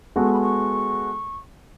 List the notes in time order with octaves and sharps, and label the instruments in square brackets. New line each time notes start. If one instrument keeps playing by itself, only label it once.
[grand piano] G#3 B3 F#4 A4
[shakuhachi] C#6
B5
C#6